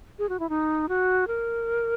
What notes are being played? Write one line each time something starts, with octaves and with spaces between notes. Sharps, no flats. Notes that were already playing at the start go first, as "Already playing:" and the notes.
G#4
F#4
E4
D#4
F#4
A#4